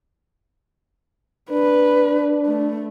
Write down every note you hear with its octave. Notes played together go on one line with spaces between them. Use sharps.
D4 B4
A3